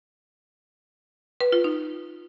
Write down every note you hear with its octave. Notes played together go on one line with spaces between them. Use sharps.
B4
F4
D#4